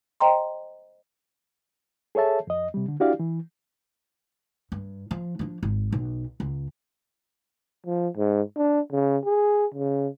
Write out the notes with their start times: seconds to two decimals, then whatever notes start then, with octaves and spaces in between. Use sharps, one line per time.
0.20 C5 D#5 G5 A#5 C6
2.15 G#4 A4 C#5 E5 A5
2.47 F2 D#5
2.74 C3 G3
2.88 D3
3.00 D4 E4 F#4 G4 D5 F5
3.19 E3
4.72 G2
5.11 F3
5.39 F3 D4
5.63 G#1
5.93 B1
6.40 C#2
7.87 F3
8.17 G#2
8.57 D4
8.92 C#3
9.25 G#4
9.75 C#3